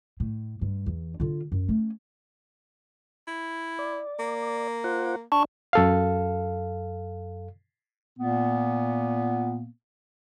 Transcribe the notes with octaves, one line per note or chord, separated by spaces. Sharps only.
A2
G2
E2
D3 F4
F#2
A3 C#4
E4
D5
A#3
F4 C5 F#5
D4 A5 C#6
F#2 A4 F5
A#2 A#3 B3